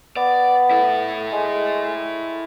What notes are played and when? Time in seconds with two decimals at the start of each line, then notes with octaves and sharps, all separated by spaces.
0.17 B3 D5
0.71 E4 A4
1.32 G#3